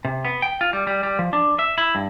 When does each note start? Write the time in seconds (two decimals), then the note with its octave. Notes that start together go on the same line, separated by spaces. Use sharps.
0.05 C3
0.25 B3
0.42 G5
0.61 F4
0.73 G3
0.87 G3
1.03 G3
1.19 F3
1.33 D4
1.59 E5
1.78 E4
1.95 G2